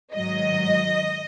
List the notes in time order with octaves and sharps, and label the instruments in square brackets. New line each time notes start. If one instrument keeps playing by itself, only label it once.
[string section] G#2 D#3 F#3 D#5